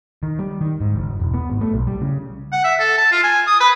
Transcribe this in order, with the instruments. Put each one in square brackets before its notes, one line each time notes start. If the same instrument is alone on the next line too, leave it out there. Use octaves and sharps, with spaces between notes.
[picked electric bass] D#3
G3
D#3
G#2
F#1
E1
B3
G#1
A3
B1
G3
C#3
[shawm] F#5
E5
A4
A5
F4
G#5
D#6
B4